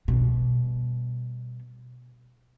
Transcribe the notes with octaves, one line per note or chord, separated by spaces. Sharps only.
B2 G3